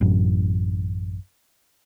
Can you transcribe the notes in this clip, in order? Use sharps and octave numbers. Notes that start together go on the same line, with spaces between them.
A1 F#2